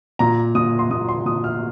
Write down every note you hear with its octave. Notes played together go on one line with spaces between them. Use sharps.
A#2 A#5
A#2 D#6
C6
A#2 D#6
C6
A#2 D#6
F6